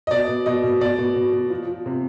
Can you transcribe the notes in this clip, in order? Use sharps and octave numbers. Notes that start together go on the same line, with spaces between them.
D#5
B2 D5
B2
B2 D#5
B2
B2 D5
B2
B2
B2
F3
F3
C3